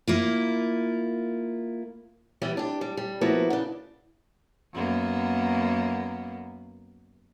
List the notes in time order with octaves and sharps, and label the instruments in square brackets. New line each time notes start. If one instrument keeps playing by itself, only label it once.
[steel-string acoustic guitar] A#3 E4 F4
E3 G3 B3 E4
D4 G4
G3
G3
F3 A#3 B3 E4 F#4
C#3 D4
[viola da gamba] F#2 A#3 B3